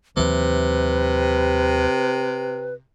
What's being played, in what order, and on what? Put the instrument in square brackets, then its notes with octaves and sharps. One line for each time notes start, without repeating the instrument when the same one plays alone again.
[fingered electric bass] D#2 E3 F#3 [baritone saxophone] C3 [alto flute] B4